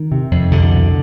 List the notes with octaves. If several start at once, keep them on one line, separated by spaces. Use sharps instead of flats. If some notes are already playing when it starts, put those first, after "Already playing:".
Already playing: D#3
C3
F2
C2 D3
B2